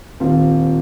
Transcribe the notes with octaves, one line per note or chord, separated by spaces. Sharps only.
D#1 C4 F4 F5